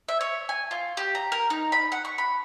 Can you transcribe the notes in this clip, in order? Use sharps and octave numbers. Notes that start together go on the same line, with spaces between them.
E5
C#5
G#5
F4
G4
A#5
A#4
D#4
B5
F#5
C#6
B5